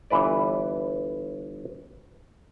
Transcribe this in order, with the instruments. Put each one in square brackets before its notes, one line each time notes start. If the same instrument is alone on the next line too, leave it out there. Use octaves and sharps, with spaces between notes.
[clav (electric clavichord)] G1 E3 B4 D5